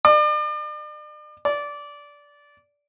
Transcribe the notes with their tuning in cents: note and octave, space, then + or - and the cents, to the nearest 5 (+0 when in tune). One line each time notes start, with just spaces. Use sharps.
D5 +40
D5 -15